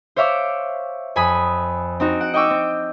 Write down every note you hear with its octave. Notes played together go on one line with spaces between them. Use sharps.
C5 C#5 E5 F5 D6
F2 G#5 B5 D#6
C4 D#4 F#4
F#5 D7
D#5 G5 C#6 D6 E6
C4